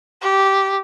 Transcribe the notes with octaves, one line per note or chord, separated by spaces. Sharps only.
G4